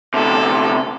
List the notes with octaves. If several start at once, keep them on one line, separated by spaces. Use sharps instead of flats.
D2 C3 A4